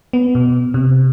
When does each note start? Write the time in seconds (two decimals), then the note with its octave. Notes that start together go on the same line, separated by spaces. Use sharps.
0.13 B3
0.35 B2
0.74 C3